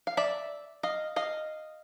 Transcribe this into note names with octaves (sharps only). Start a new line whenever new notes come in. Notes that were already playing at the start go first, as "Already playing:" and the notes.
F5
D5 E5
D#5 F5
D#5 F5